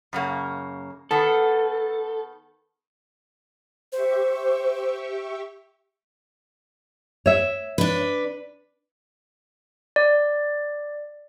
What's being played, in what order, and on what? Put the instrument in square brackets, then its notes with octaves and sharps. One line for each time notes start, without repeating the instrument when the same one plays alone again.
[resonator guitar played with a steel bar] F#2 C#3 A#3
[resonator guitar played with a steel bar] D#3 B3 [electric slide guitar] A4
[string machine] G4 E5 C#6 [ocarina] C5
[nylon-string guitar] C#5 E5
[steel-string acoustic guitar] D4 B4
[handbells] D5